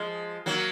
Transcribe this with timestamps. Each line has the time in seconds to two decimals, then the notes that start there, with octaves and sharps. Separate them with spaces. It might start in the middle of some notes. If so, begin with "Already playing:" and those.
Already playing: F3 G#3
0.46 F#3 A#3